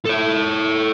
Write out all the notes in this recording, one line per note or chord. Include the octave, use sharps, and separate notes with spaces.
A4 C#5